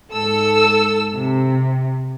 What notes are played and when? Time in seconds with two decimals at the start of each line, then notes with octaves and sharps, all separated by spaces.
0.13 G#2 A4 E6
1.14 C3